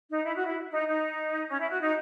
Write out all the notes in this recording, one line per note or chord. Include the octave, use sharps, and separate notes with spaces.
D#4
E4
F#4
E4
D#4
D#4
C#4
E4
F#4
D#4